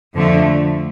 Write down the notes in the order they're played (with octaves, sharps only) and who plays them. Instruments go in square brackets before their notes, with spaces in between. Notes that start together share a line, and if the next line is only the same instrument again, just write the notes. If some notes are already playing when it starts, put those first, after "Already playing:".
[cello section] F2 D3 F3 A3